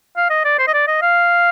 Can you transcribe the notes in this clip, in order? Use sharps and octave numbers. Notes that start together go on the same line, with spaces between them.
F5
D#5
D5
C5
D#5
D5
D#5
F5